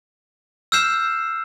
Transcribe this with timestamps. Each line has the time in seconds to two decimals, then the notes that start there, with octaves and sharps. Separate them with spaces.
0.72 E6 F6 G6 C7 E7